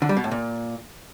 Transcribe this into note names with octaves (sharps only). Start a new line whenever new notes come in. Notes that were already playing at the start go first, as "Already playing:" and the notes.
D3
G3
B2
A2
A#2